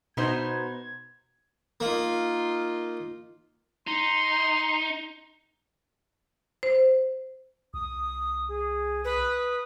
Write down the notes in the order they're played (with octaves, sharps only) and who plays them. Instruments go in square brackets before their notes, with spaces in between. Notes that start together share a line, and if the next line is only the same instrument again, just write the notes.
[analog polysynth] B2 [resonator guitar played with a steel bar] B3 D#4 C5 [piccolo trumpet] G#6
[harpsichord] A#3 [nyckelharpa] D#4 F4
[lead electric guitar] D#4 [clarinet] C6
[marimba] C5
[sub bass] C2 [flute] D#6
[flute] G#4
[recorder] B4 [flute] D#6